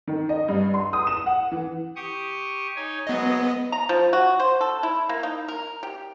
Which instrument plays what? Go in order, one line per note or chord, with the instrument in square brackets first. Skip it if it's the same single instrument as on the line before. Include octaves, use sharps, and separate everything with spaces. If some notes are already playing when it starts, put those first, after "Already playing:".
[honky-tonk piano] D#3
D#5
G2
C6
D#6
E7
F#5
E3
[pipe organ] G4 C#6 D#6
D#4 C#5 G#5
[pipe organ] F#3 G#3 [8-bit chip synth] B3 D#5
[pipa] A#5
F3
F#4
C5
A4
E4
A#3
D#4
A#4
G4